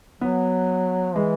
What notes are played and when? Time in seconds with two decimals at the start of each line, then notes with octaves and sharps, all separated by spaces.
0.21 F#3 B3
1.15 E3 G#3